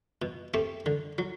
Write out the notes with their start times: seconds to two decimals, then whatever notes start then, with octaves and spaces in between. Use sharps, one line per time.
0.22 B2
0.54 A3 C4 G4
0.86 D3
1.18 F#3